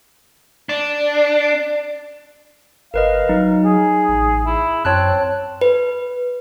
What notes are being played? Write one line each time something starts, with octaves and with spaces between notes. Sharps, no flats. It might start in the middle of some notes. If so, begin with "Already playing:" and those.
D4
G1 A#4 B4 D#5 F5
F#3 D#4
G#4
A1
E4
F#2 C4 C#5 A5 F#6
B4